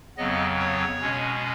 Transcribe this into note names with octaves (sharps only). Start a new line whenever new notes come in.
F2 C#3 F#3 B3 D#5
C#5
B2 G#3 C#4